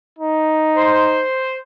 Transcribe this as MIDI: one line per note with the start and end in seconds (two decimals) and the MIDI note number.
0.19 1.25 63
0.76 1.56 72